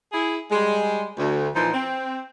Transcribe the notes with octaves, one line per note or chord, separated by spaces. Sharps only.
E4 G#4
G3 G#3
D2
A#2 E3 F3 D#4
C4